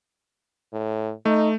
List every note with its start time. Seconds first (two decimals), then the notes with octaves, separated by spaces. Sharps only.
0.73 A2
1.25 A3 D#4